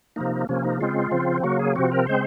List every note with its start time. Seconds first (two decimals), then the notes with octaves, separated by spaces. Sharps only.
0.16 C3 F3 A#3 D#4
0.49 C3 F3 A#3 C#4
0.64 D#4
0.80 C#3 G#3 C4 F4
1.11 C#3 F3 C4
1.43 C#3 F#3 A#3 F#4
1.59 G#4
1.76 C3 F3 C4 F#4
1.92 A#4
2.07 C#3 G#3 C4 C5